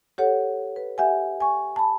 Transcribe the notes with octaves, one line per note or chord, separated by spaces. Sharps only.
G4 A4 C#5 F#5
B4
G4 E5 F#5 G#5
G#5 C#6
A5 B5